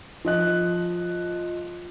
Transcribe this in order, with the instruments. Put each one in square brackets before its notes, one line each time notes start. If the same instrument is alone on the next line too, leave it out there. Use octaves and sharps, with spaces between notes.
[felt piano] F3 D#5 F#6